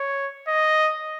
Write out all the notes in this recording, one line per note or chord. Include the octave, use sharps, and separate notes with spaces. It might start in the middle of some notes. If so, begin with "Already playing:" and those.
Already playing: C#5
D#5